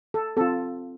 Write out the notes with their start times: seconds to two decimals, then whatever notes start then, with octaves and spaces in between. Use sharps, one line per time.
0.14 A4
0.37 C4 F4 A4